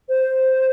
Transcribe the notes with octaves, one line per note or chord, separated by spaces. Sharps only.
C5